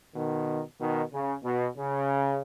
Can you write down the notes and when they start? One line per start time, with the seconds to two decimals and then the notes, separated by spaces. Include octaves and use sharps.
0.15 B2 D#3
0.79 B2 D#3
1.12 C#3
1.44 B2
1.76 C#3